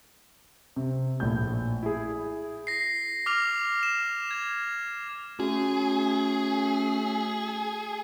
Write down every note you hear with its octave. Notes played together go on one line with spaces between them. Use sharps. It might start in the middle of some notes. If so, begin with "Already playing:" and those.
C3
A#1 A2 G6
E4 G#4
A#6 C7
D6 F6 A#6 F7
E7
G#6
A3 C#4 F#4 G#4